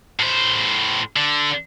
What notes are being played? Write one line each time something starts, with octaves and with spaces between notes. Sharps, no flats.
A2 C5
D3